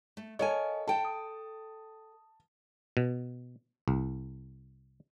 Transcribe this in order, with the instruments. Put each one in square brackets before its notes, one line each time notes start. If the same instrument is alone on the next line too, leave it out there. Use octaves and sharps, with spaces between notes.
[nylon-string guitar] A3
[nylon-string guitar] A4 A#4 G#5 [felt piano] C#5 [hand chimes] D#5 F5 A5
[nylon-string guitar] A4 G5 [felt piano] A5
[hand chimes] D#6
[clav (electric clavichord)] B2
C2